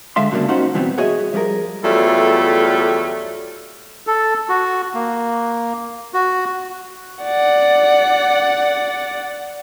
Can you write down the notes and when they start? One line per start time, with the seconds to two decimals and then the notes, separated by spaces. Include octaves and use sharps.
0.16 D3 G#3 E5 F5 C6
0.31 G2 C#3 F#3 G#3 A#3 D4
0.48 C#4 D#4 F#4 G4 C5
0.74 B2 E3 G3 A3 B3 C4
0.98 F#4 G#4 C#5 D#5 E5
1.34 F3 G3 G#4 A#4
1.83 E2 F#3 G3 A3 F4 A4
4.07 A4
4.49 F#4
4.94 A#3
6.14 F#4
7.23 D5 F#5